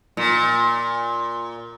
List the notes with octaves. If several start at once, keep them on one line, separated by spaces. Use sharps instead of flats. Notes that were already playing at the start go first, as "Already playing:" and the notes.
A#2